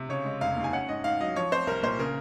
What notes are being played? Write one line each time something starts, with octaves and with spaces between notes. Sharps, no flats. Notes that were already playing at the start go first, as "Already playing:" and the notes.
Already playing: C3
C#3 C#5
G#3
F1 F5
D#2
G#5
C#4 F#5
G#2 D#5
G#2 F5
F#3 D#5
F3 C#5
C4 C5
C2 A#4
A#2 C5
C#3 A#4